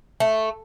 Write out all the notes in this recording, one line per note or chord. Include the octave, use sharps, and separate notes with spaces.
A3